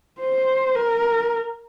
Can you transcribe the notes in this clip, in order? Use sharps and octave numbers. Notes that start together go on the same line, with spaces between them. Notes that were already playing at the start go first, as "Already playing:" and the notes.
C5
A#4